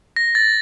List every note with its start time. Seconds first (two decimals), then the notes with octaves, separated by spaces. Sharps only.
0.16 A#6
0.35 A6